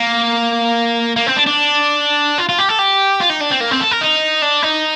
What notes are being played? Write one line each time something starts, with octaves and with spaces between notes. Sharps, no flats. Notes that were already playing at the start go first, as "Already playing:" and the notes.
Already playing: A#3
A#3
C4
D4
D4
F4
F4
G4
A4
G4
F4
D#4
D4
C4
A#3
C4
A4
A#4
D#4
D4
D#4